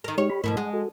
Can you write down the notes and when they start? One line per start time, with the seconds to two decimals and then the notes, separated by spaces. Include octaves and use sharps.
0.04 D#3 A#4
0.18 G#3 D#4 G4 C#5
0.30 G4 B5
0.44 G#2 B2 F3 A3 E4 A#4
0.57 G#3 F#5
0.73 F#4 A4